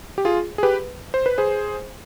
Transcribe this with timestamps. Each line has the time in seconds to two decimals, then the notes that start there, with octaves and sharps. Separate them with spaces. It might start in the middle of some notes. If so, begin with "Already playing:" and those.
0.18 G4
0.25 F4 G#4
0.58 G#4
0.63 G4 B4
1.14 C5
1.26 B4
1.38 G#4 C5